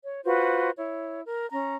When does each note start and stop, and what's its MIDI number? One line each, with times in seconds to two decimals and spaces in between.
0.05 0.22 73
0.24 0.70 65
0.24 0.70 66
0.24 0.70 71
0.24 0.70 72
0.76 1.20 64
0.76 1.20 73
1.26 1.49 70
1.52 1.75 61
1.52 1.75 82